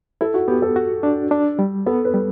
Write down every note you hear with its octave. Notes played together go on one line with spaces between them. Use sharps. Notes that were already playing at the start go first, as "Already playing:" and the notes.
E4 A4
F#4
B3 G4
A4
F#4
D4
D4
G3
B3 A4
B4
G3